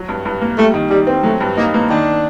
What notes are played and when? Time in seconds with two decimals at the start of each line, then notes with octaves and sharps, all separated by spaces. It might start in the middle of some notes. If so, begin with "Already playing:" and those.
Already playing: F#3
0.09 G2
0.25 G2
0.42 A#3
0.57 G3 A3
0.74 D#3
0.90 D#3 G3
1.07 C4
1.23 F#3 A3
1.40 G2
1.57 A#3 D#4
1.74 A#3
1.90 D#3 D4